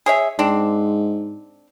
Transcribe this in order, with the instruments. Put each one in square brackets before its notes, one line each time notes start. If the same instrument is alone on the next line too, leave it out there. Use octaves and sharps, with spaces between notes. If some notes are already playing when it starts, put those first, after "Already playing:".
[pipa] G#4 C#5 E5
[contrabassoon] G#2 [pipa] C4 D4